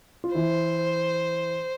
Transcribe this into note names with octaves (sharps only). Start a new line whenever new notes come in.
F4
E3 E4 C5